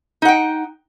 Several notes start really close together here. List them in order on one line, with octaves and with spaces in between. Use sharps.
D#4 F#5 G5